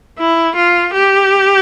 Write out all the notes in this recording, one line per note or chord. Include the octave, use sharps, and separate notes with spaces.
E4
F4
G4